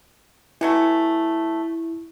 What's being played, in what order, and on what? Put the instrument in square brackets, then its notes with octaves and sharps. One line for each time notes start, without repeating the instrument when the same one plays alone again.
[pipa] E3 F#3 A3 [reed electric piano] E4